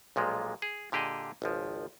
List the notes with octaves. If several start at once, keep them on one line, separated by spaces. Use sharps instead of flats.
B1 A#2 F3 G#3
G#4
A#2 D3 G4 G#4 D#5
G#1 C#2 F3